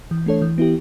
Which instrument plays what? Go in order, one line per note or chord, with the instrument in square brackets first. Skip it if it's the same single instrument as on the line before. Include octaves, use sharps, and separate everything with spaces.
[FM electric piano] E3
A3 D4 A4 C#5
E3
B3 E4 G4